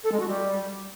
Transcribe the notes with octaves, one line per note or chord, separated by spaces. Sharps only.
A4
G#3
F#4
G3